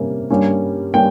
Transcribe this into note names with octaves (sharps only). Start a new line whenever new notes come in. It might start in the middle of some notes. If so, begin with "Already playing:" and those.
Already playing: C3 G3 A#3 C#4
G2 G3 A#3 C#4
G3 A#3 C#4 G5